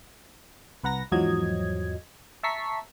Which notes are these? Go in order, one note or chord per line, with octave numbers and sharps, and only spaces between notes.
C2 B4 F#5 A#5 A#6
E2 G#2 F3 F#3 D#5 G#6
E5 A5 A#5 C#6 B6 C7